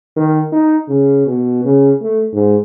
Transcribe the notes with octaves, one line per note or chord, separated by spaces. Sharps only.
D#3
D#4
C#3
B2
C#3
A3
G#2